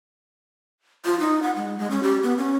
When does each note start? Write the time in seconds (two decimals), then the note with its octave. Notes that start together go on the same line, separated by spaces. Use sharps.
1.05 F4
1.20 D#4
1.42 F#5
1.56 G#3
1.78 G#3
1.90 C#4
2.03 G4
2.23 B3
2.38 C#4